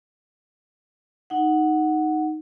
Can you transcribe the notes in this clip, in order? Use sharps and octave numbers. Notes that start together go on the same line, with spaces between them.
D#4 F#5